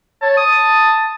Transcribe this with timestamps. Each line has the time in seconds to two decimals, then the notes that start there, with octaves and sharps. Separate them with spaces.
0.22 C#5 A5
0.37 D#6